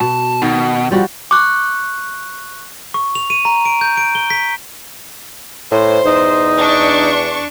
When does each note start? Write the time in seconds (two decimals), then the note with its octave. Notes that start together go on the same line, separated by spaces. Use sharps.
0.01 B2 A5
0.42 B2 D#3
0.91 F3 G3 F#4
1.31 C#6 D6 F#6
2.94 C#6
3.15 F7
3.30 D#7
3.45 A#5
3.66 D7
3.81 G6
3.97 D7
4.15 G7
4.30 B6
5.72 A2 C5
6.05 E2 D#4
6.56 D4 C#6